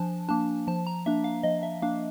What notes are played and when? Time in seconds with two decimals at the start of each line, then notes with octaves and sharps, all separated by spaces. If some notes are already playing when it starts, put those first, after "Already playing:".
Already playing: F3 D4 G#5 A5
0.29 A#3 D4 A5
0.67 F3 A5
0.87 A#5
1.06 A#3 D4 E5
1.24 F5
1.43 F3 D#5
1.63 E5
1.82 A#3 D4 F5